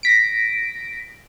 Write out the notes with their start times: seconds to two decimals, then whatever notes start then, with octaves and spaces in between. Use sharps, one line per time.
0.03 A#6 B6 D7